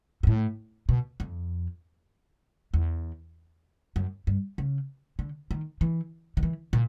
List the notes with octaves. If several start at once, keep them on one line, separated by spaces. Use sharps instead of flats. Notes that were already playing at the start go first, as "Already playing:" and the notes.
G#2
A2
B2
F2
E2
F#2
G2
C#3
D3
D#3
E3
D#3
E3
A#2